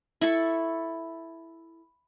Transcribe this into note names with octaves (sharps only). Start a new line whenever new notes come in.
E4 A4 C#6